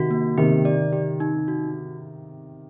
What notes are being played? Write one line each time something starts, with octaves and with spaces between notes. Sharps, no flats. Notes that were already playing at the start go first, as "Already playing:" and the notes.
Already playing: C3 D#3 F#4
A#3
C3 D#3 G4
D5
G4
D#4
F#4